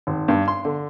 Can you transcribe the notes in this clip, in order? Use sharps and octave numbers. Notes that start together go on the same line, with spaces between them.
G#1
G2
C6
D3